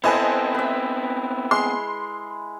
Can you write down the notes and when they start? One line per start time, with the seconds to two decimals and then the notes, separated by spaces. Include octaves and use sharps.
0.04 B3 C4 E4 A4 B4 C5 D#5 G#5
0.54 B4 E5
1.51 G#3 C6